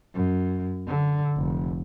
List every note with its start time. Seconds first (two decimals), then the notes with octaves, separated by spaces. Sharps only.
0.14 F#2
0.87 D3
1.36 F1